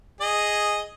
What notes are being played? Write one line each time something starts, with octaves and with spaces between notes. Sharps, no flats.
G#4 D#5